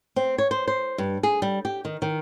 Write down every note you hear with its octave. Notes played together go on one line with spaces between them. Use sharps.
C4
C#5
C5
C5
G2
G#4
G3
G4
D#3
D#3